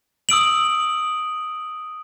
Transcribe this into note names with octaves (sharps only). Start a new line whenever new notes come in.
D#6 E6 D7 F#7